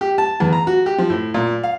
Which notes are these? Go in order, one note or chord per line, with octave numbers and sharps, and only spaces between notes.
G4
A5
E2
A#5
F#4
G4
F3
A2
A#2
F5